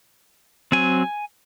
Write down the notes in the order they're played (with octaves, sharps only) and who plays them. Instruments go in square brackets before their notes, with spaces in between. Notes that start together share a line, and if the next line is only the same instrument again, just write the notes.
[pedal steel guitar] F#3 C4 G#5